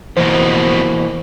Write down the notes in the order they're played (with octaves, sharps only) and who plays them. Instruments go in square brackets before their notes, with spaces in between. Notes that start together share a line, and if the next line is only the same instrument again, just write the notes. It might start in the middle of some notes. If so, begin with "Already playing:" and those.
[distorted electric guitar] F2 B2 [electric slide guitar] E3 A#3 [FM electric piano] C5